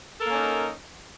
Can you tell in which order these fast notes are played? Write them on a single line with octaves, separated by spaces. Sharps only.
A4 A#4 A#3 C#4 D#4